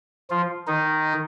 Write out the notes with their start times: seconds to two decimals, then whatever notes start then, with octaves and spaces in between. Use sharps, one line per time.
0.30 F3 F4
0.67 D#3 D#4